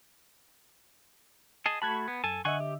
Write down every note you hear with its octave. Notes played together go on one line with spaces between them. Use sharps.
G#4 D#5 A5
A3 F#4 A5 B5 F#6 G#6
B3
F#2 A4 G#5 A5
D3 D#5 E5 F#5 G#5 C#6
G4